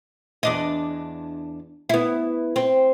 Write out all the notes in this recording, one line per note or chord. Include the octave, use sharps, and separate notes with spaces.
E2 D4 D#5
B3 E4
C4